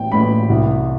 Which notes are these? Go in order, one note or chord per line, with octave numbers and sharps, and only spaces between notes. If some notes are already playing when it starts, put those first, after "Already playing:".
Already playing: A1 G5
A1 B5
C2